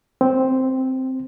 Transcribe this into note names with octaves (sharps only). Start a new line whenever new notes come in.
C4